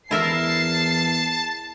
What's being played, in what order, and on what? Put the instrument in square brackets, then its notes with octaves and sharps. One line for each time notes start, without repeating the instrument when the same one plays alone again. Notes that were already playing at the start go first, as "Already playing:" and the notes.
[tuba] E2 [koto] E4 A#4 E5 [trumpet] A5 [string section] C7